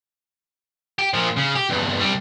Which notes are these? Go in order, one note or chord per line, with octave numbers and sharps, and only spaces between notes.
G4
A#2 F3
C#3
G4
E2 G2
C2 G3